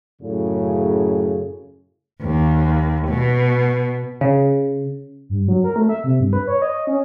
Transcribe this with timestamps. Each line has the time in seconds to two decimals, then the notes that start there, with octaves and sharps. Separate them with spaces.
0.22 F#2 A2 C#3
2.22 D#2
3.08 B2
4.21 C#3
5.29 G2
5.48 F#3
5.64 A#4
5.76 A3
5.89 E5
6.04 C3
6.20 G2
6.33 B4
6.47 C#5
6.62 D#5
6.75 D#5
6.87 C#4